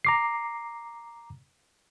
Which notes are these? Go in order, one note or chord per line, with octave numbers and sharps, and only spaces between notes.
A#5 D6 C7